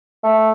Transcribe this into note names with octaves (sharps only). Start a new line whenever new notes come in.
A3